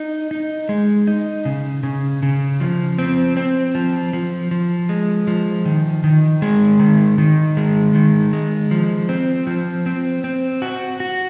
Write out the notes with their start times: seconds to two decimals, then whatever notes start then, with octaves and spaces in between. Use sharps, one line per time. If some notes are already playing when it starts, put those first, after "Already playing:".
Already playing: D#4
0.31 D#4
0.69 G#3
1.07 D#4
1.45 C#3
1.83 C#3
2.23 C#3
2.60 F3
2.99 C4
3.37 C4
3.75 F3
4.13 F3
4.51 F3
4.89 G#3
5.27 F3
5.66 D#3
6.04 D#3
6.42 G#3
6.80 D#3
7.18 D#3
7.57 G#3
7.95 D#3
8.33 G#3
8.71 F3
9.09 C4
9.47 F3
9.86 C4
10.24 C4
10.62 F#4
11.00 F#4